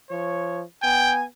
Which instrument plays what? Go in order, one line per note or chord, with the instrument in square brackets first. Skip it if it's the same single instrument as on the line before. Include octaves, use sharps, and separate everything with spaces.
[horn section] F3 C#5
[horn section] B3 G#5 [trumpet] G5